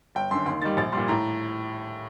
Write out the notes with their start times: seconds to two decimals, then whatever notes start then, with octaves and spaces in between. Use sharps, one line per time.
0.15 G1 G5
0.31 F#2 D3 C6
0.46 D#2 C6
0.62 D#3 G3 A6
0.77 A#1 A6
0.92 A#2 G3 C6
1.08 A2 A#5